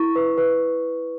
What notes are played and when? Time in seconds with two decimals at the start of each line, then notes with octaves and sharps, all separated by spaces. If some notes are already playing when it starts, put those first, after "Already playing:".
Already playing: E4 C#6
0.16 B4
0.38 B4